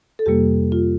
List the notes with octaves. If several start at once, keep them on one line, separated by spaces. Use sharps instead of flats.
A4
F2 C3 G3 A#3 G4
F4